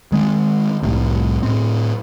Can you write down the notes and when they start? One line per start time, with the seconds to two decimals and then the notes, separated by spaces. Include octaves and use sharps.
0.12 D#3 G#3 C4
0.83 C2 F2 A2 C3
1.43 A2 C4